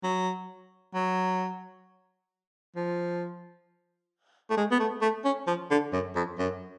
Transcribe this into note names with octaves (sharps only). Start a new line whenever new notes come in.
F#3
F#3
F3
A3
G#3
B3
A3
A3
C#4
F3
D3
F#2
F2
F#2